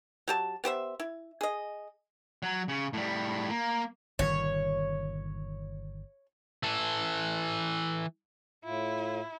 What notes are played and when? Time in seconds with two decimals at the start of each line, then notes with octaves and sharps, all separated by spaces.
0.28 F#3 G4 A5
0.64 B3 G4 C5 E5
1.00 E4
1.41 G#4 D#5
2.43 F#3
2.68 C#3
2.93 A2 G3
3.50 A#3
4.19 G1 A#2 D#3 C#5
6.63 E3 A4
8.65 A2 E4 F4